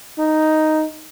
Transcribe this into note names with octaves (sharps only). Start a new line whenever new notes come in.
D#4